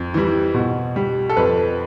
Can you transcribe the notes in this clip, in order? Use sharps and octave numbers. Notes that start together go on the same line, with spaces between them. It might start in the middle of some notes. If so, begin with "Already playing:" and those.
Already playing: F2
E3 G3
B2
G3
A4
F2 B4